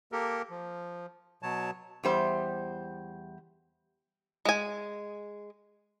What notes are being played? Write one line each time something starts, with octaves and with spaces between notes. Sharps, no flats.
A#3 G4 A4 A#4
F3
B2 F#3 C#5 A5
E2 G3 C5
G#3 G#5